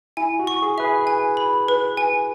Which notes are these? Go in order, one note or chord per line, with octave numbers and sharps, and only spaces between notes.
E4 G#5
F#4
C#6
G#4
B4 E5
G#4
G#5
B5
B4
G#5